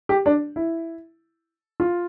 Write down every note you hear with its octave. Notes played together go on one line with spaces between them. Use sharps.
G4
D4
E4
F4